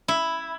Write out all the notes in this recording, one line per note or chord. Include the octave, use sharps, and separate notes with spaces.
E4